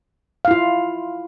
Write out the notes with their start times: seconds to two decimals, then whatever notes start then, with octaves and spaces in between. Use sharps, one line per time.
0.45 F5
0.48 E4
0.51 F4